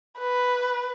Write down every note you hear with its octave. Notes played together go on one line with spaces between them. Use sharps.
B4